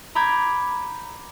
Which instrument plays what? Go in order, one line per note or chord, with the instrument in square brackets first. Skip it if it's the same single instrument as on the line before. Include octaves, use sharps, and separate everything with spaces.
[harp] A#5 B5 D6 G6 G#6